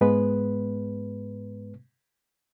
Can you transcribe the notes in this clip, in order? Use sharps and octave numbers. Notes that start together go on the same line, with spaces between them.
G#2 G#3 B3 B4